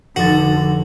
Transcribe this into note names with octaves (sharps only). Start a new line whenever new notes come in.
F1 D3 D#4 F#4 A6